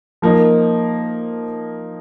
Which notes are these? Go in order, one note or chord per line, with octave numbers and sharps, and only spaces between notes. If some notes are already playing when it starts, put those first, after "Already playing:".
F3 A#3 D#4